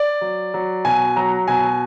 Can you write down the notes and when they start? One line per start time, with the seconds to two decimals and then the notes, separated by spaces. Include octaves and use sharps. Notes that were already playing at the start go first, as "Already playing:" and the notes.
Already playing: D5
0.21 F#3
0.54 F#3
0.85 B2 G#5
1.16 F#3 A#5
1.48 B2 G#5